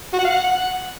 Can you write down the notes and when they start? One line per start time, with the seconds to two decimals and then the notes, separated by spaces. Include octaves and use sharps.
0.13 F#4
0.19 F#5
0.24 F5
0.30 F#5